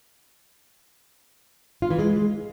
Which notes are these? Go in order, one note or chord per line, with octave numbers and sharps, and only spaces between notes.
F4
E3
G#3